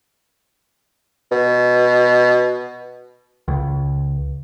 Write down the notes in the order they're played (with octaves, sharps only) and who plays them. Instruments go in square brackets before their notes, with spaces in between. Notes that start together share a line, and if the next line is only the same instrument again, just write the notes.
[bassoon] B2
[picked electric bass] C#2